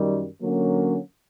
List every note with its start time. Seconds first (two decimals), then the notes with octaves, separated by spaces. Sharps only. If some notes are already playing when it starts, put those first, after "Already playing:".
Already playing: F#2 D#3 G3
0.41 D3 F#3 A#3 C#4